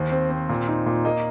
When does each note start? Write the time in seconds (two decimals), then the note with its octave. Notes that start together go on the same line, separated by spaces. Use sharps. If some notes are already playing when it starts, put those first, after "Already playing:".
Already playing: D#2 C5
0.12 C4
0.30 C4
0.49 A#2
0.68 D#4
0.86 A#2
1.05 A#3 D#5